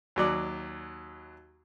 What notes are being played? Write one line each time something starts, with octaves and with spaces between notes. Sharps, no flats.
D#2 F#3 D5